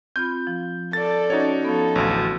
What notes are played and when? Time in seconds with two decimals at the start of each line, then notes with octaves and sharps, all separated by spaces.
0.16 C4 F4 B5 G6
0.47 F3
0.93 A4 D5 A6
1.30 C#4 D#4 F#4 C#5
1.65 F3 B3 A4
1.96 A1 D2 F#4 F5